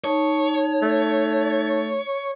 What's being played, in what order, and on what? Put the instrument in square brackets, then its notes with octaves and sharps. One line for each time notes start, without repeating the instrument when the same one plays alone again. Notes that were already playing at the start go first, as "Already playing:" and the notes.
[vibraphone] D#4 A5 [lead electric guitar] C#5
[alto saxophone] A3